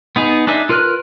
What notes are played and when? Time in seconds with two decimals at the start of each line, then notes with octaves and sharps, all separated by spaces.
0.16 B3 D#4 G#4
0.47 D4 D#4 G#4 E5
0.69 F4 A#4 B4 F6 F#6